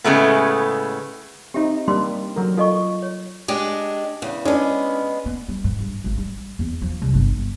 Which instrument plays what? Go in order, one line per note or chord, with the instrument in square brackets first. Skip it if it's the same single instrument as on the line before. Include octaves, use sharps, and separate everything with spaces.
[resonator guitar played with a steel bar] A2 C#3 G#3 A3 B3
[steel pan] C4 D#4 [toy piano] G4 E5
[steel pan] G3 A#3 D4 [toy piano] C6
[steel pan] F#3 A#4
[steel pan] F4 [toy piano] A4 D#5 C#6
[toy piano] C#5
[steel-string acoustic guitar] G#3 D4 G4
E2 C#3
[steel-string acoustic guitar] G#3 B3 [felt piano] C#4 D4
[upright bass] B3
G3
G#2
G2
G#1
G3
E2
F3
C2
G1
G1